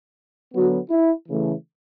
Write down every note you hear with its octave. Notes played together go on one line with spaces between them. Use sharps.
D3 F#3 B3 F#4
E4
C#3 E3 A3